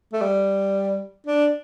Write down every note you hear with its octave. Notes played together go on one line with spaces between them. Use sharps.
A3
G3
D4